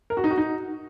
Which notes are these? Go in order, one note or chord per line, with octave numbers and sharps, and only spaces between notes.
A#4
F#4
D#4
F#4
D#4